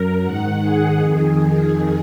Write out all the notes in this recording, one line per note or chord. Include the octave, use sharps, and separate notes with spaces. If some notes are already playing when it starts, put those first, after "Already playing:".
Already playing: F#2 A#4
G#2 D#3 F#5
G#4
F2 D#3